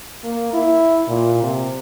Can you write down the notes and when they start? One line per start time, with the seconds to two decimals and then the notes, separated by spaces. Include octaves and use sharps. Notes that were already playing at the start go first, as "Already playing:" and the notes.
0.24 A#3
0.53 E4
1.08 A#2
1.43 C3